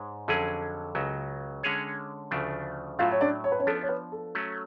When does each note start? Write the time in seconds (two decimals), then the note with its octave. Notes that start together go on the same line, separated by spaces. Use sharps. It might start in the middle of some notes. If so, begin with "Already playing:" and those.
Already playing: G#2 G#3 C#5
0.28 F2 D3 F#3 C#4 G#4 A4
0.95 C#2 C#3 F#3
1.63 D3 G#3 C#4 G#4 C#5
2.31 D2 C#3 F3 A3 D4
2.99 A2 F#3 A3 F4 F5
3.11 C#5
3.21 D4 D5
3.44 C#5
3.52 B4
3.59 C#4 C#5
3.67 F3 B3 D4 A4
3.83 C#5
3.89 B4
4.12 A4
4.35 F#3 A3 C#4